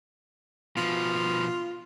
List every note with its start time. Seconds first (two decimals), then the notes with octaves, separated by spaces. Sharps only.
0.77 B2 F3 F4